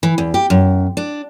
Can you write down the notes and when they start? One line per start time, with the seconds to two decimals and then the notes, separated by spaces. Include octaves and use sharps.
0.03 E3
0.18 E2
0.34 G4
0.50 F#2
0.97 D4